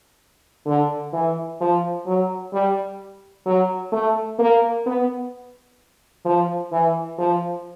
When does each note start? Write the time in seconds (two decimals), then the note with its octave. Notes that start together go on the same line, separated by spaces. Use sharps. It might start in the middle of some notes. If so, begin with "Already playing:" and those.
0.66 D3
1.13 E3
1.60 F3
2.06 F#3
2.53 G3
3.46 F#3
3.92 A3
4.39 A#3
4.86 B3
6.25 F3
6.72 E3
7.19 F3